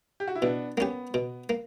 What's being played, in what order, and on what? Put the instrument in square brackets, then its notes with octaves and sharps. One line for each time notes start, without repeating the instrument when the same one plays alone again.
[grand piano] G4
F#4
E4
[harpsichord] B2 [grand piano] B3 D4
[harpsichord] A#3 C#4 G4 [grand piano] B3
[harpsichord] B2
A#3